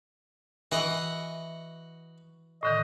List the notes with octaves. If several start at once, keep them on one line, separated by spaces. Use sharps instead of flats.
E3 F#4 D#5 F#5
A2 D3 D#3 D#5